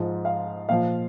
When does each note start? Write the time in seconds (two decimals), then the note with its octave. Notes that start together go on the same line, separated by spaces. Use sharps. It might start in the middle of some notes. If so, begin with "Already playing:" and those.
Already playing: G#2 F3
0.25 F5
0.69 A#2 F3 F5